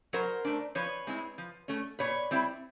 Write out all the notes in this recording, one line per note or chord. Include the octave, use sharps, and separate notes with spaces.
F#3 A#4 C5
A3 D4
F3 B4 C#5
G#3 C4 E4
F3
A3 C#4
A#2 B4 C#5
G3 C4 E4